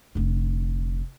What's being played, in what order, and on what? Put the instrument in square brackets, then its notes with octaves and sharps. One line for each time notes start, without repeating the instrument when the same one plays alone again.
[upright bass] F1 D3